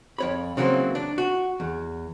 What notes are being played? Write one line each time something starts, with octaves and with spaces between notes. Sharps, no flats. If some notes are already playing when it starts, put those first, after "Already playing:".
F2 C#5 B5
C#3 E3 F#3 A3 A#3 C4
D4
F#4
E2